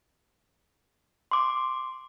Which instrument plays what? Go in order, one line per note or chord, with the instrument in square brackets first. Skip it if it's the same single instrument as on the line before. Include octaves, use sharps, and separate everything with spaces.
[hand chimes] C6 D6